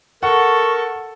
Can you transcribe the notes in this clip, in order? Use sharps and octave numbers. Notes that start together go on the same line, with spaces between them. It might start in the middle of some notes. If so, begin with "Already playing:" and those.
A4 A#4 F#5 C#6